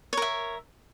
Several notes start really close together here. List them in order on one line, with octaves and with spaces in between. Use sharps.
C#5 A#4 E5